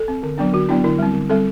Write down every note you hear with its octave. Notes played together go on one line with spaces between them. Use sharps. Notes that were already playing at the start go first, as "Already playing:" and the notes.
Already playing: A4
C4
D3
F#3 B3 D4
D3 F#4
F#3 B3 D4 E4
D3 E4
G3 C4
D3
G3 C4 A4